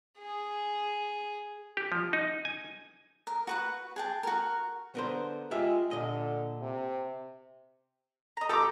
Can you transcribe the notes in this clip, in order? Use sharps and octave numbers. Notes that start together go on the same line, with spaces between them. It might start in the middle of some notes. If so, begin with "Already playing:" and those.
G#4
G4
F3
D#4
G#5
A#4
F#4 B4 F#5
G#4 G5 A5
F#4 A#4
D3 B3 A#4 C5
G#3 F4 G4 E5
A#2 D3 D#5
C3
D#5 A#5
G4 A4 G5 A#5 D6